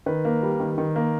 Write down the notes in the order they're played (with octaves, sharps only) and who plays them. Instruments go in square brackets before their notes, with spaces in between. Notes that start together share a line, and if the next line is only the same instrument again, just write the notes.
[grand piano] D#3 B4
A#3
G3
D#3
D#3
A#3